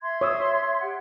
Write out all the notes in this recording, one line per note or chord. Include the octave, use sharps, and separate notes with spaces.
E5 C6 G#6
C#5 D#6 E6
G4 F#5